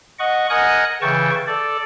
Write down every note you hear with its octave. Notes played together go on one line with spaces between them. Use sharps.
D#5 F#5 C#6
A#4 D#5 F#5 G#5 D#6 F#6
C#3 E3 G5 A5 C#6
A4 D5